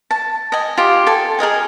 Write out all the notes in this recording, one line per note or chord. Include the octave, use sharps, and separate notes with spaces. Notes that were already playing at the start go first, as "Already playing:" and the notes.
A5
D#5 G#5
F4 G4
A4 G#5
G#4 A#4 D#5 G#5